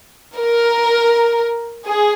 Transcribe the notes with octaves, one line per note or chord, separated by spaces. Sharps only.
A#4
G#4